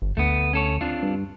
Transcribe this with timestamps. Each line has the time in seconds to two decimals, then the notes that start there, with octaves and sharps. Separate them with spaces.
0.02 G1
0.17 D2 A3 B3
0.53 C#4 A4 C#5
0.81 C4 D4 F4
1.03 G2